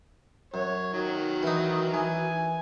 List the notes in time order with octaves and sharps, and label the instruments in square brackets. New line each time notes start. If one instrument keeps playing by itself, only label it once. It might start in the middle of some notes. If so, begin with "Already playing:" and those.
[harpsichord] F#2 [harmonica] C#5
[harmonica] D#3 F#3
[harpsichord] E3 D#4
[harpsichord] E3 [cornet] G#5